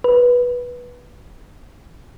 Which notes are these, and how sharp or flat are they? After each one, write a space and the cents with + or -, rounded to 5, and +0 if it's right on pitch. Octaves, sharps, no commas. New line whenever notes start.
B4 -15